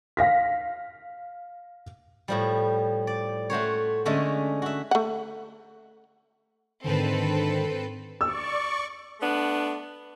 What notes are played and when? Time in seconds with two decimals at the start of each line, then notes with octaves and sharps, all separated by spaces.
0.17 F5 A#6 B6
2.28 A2 F3 G3
3.07 D5
3.50 A3 F#4 C5 C#5
4.06 D3 G#3 A3 C#4 A4
4.62 F#4 E5
4.91 A3 F#5
6.84 G#2 D3 D#3 C4 A4 B4
8.21 D5 C#6 E6
9.21 A3 B3 D4